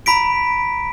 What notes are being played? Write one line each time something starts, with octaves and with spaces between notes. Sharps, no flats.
A#5 B5 B6 D7